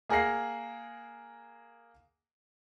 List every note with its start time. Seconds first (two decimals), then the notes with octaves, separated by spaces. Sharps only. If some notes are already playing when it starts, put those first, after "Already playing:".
0.09 A#3 G#4 A#4 F#5 A#6 C7